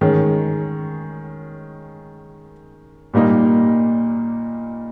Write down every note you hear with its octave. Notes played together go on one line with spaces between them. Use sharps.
D#3 G#3 C#4
A#2 G3 A#3 D#4